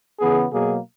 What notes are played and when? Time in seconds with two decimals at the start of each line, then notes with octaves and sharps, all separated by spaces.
0.20 C#3 E3 B3 G#4
0.52 B2 F#3 A#3 G#4